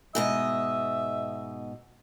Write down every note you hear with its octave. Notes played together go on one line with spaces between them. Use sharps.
G#2 B2 D#5 E5